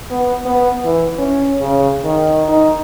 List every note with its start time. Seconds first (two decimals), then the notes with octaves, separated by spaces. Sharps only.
0.10 B3
0.46 B3
0.84 E3
1.18 C#4
1.61 C#3
2.05 D#3
2.49 D#4